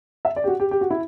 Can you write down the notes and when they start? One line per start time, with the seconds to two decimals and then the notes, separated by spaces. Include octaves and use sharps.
0.25 E5
0.36 D5
0.44 G4
0.48 F#4
0.60 G4
0.71 G4
0.81 F#4
0.90 E4